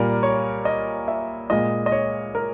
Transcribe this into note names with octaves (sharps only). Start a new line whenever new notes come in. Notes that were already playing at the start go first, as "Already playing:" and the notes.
Already playing: A#2 G3 A#4
C#5
D#5
E5
A#2 G#3 D#5
D#5
C#5
A#4